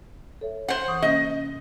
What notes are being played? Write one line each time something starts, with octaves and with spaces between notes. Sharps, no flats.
A4 C#5 E5
C5 F#5
E3 C#6 D#6
C3 A#3 C#4 D#5